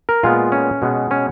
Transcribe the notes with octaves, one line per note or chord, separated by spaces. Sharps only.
A#4
A#2 G#3 B3 F4
C#4
B2 G#3 B3
C#4